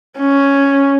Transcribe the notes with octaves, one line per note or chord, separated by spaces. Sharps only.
C#4